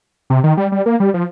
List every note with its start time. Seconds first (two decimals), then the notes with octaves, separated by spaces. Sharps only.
0.30 C3
0.44 D#3
0.57 G3
0.72 G3
0.86 A#3
1.00 G3
1.14 F3